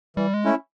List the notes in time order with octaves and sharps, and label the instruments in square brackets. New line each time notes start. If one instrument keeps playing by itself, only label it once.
[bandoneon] E3 [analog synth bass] G3
[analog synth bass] G#3
[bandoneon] A3 C#4 E4